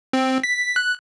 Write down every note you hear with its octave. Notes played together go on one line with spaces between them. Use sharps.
C4
B6
F#6